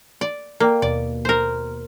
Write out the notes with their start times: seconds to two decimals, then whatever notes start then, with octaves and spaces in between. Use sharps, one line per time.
0.21 D5
0.60 A#3 D5 G5
0.82 D#2 B2 D5
1.25 A#4 C5